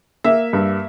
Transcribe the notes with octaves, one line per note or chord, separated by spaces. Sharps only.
A#3 E5
G2